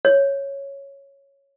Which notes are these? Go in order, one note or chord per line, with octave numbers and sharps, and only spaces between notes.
C#5